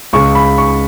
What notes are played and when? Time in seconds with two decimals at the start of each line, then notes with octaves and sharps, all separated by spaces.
0.13 C#2 C#3 G#3 C#6
0.35 B5
0.58 C#6